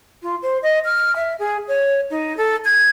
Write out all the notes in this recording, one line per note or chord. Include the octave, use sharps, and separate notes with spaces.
F4
C5
D#5
F6
E5
G#4
C#5
D#4
A4
G#6